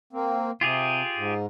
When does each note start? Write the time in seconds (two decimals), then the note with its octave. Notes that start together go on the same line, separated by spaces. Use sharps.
0.13 A#3 C4
0.61 C3 F4 G4 G#4
1.17 G#2